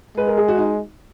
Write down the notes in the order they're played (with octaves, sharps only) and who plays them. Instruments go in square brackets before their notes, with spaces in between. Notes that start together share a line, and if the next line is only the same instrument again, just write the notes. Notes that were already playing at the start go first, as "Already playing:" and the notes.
[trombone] G#3 [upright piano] B4
[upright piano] A#4
G#4
F#4
D#4